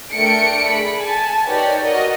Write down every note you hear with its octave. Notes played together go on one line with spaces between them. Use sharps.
A3 D4 A#4 G5 C#7 D7
G#4 B5
G#5 A5
D#4 G4 A#4 B4 C#5 D5
F#4 A#4 C#5 D#5